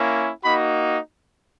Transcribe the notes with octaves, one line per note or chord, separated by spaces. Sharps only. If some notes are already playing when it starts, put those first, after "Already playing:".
Already playing: A#3 C#4 E4
A#3 D#4 F#4 B5